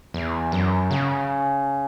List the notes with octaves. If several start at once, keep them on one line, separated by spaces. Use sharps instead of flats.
E2
F#2
C#3